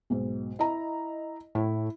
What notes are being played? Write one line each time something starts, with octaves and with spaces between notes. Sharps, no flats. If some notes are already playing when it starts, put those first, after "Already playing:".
B1 G#2
E4 D#5 A#5
A2 E4